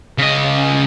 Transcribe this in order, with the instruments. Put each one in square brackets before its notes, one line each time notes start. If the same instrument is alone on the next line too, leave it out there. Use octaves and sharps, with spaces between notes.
[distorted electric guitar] C#3 D#5